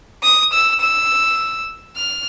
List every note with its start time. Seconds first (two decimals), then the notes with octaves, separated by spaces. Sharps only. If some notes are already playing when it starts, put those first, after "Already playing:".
0.23 D#6
0.53 E6
0.81 E6
1.96 F6